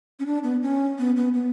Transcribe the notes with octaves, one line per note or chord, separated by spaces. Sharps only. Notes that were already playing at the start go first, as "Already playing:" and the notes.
C#4
D4
B3
C#4
B3
B3
B3